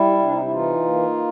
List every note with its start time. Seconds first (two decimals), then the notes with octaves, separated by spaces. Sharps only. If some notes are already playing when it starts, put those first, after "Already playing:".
Already playing: G3 E4
0.19 C3 D4
0.32 D#4
0.42 E4
0.51 E3 D#4 F4
0.84 A#3